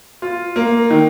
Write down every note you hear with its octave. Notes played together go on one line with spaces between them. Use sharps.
F4
A#3
D#3